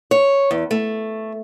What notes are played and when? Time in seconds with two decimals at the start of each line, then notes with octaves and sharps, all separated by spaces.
0.11 C#5
0.51 E2
0.71 A3